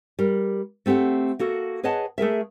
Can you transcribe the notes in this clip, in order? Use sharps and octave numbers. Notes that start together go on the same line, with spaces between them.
G3 A#4
A3 C4 G4 A4 F#5
A#3 F#4 A4
G#4 B4 C#5 D#5 F#5 A5
A3 G#4 A#4 E5